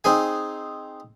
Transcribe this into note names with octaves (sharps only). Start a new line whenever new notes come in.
C4 D#4 G#4 G#5